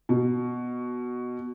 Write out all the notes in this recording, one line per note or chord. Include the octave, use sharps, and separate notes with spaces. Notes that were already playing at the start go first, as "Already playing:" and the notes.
B2